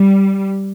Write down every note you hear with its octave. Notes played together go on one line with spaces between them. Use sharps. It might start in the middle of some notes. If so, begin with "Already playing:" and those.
Already playing: G3